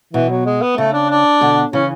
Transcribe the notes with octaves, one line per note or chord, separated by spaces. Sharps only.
B2 E3
F#3
G#3
B3
C#3 A3
D4
D4
B2 D3
C#3 E3 C#4